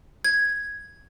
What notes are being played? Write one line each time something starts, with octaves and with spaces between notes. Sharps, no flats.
G#6